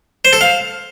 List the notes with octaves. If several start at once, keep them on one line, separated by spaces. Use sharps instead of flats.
C5
A4
F5